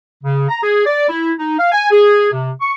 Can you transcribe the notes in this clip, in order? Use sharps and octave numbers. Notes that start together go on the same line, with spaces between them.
C#3
A#5
G#4
D5
E4
D#4
F5
G#5
G#4
C3
C#6